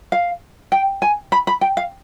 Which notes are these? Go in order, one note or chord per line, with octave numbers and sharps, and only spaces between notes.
F5
G5
G#5
B5
B5
G5
F5